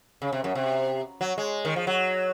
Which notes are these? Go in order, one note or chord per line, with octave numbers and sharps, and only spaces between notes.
C#3
C3
F#2
C3
F#3
G#3
D#3
F3
F#3